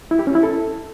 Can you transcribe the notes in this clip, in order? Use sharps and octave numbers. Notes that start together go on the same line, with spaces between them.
E4
G4
C#4
E4
A4